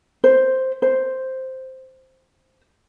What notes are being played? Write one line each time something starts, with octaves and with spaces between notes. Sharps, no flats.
C5
C5